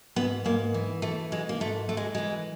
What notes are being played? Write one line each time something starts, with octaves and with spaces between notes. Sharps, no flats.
G#2 B3
G#2 A#3
E3
E3 A3
G#2 G#3
A#3
G#2 A3
E3 A3
G#3
E3 G#3